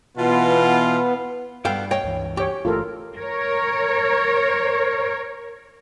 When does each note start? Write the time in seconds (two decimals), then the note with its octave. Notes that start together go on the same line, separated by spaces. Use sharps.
0.17 B2 E3 B3 F4
1.65 G2 G3 B3 A4 F5 G5
1.91 C#5 D#5 G5
2.03 C#2 G2 E3
2.37 G4 C#5 G5
2.65 G1 E3 A3 F4 A4 A#4
3.17 A#4 C#5